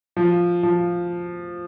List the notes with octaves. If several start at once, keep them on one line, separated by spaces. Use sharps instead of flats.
F3
F3